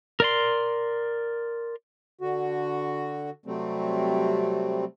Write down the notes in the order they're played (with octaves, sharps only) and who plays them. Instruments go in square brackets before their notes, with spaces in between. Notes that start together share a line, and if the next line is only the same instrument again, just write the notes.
[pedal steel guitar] A#4 D5 C6
[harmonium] D3 F#4
C3 F#3 G3 A3 C4